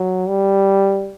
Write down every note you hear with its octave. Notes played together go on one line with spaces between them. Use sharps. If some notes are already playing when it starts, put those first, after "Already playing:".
Already playing: F#3
G3